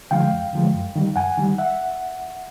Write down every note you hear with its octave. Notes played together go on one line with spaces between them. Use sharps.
D3 F3 G#3 F5 G5
F2
D3 F3 G#3
F#2
D#3 G3
F#2 F#5 G#5
D#3 G3
E5 F#5